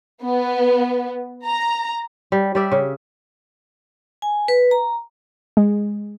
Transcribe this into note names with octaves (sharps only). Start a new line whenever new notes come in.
B3
A#5
G3
G3 D5 E5
C#3
G#5
B4
A#5
G#3